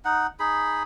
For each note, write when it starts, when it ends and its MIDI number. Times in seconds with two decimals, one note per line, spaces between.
0.05 0.27 63
0.05 0.27 78
0.40 0.83 63
0.40 0.83 68
0.40 0.83 83